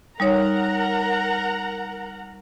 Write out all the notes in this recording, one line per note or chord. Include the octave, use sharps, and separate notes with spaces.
G3 D#4 A#4 C#5 F#5 A#5